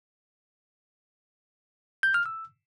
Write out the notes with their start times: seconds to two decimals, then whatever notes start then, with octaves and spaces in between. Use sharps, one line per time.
2.03 G6
2.14 F6
2.26 E6